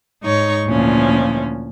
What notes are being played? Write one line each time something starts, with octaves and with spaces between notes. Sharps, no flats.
G#2 D#4 C#5 C#6
D2 A#2 E3 F3 C#4